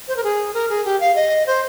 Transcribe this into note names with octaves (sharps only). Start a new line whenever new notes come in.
C5
A#4
G#4
A#4
G#4
G4
F5
D#5
C5